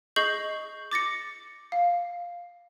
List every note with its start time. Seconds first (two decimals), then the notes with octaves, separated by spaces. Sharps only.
0.16 G#4 D#5 C#6 G6 C7 F#7
0.92 D6 A6 A#6 C#7
1.72 F5